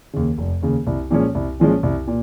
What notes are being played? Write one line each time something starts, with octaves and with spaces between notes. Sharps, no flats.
D#2 C#3
F1
D#2 C#3
C2
A#2 F3 G#3 C#4
C2
A#2 F3 G#3 C#4
C2
A#2